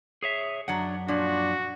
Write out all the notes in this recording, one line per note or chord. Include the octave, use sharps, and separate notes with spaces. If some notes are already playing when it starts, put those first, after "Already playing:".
G#4 C#5 E5
F#2 F#3 D4 F#5
A#2 F3 D4 F#4